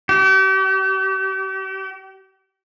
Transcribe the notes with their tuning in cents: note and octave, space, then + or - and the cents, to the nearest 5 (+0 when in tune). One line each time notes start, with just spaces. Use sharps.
G4 -40